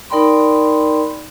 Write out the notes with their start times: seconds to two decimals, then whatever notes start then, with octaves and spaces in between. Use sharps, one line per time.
0.10 D#4 A#4 D5 G5 B5 C6